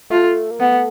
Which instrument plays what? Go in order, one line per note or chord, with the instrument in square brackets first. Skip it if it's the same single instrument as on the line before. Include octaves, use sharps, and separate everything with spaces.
[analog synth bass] A3 [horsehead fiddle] F4
[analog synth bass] A#3
[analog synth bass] A3 [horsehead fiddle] B3